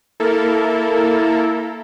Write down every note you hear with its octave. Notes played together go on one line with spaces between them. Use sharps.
A#3 E4 A4 A#4